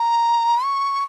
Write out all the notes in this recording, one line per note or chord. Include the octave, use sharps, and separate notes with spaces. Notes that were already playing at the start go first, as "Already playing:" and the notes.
Already playing: A#5
C#6